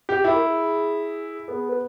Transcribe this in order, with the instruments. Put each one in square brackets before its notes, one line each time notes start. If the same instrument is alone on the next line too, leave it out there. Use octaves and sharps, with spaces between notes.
[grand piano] G4
[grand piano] E4 [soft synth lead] G#4
[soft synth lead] A#4
G#4
[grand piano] B3 [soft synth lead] G#4
[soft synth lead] B4